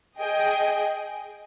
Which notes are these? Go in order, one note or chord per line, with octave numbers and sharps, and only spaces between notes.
G#4 D#5 G5